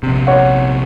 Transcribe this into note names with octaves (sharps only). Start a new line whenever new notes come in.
A#1 C3
C#5 F#5